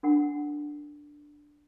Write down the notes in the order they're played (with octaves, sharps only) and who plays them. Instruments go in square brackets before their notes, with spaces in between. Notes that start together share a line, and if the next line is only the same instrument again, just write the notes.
[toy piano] D4 A#4 F#5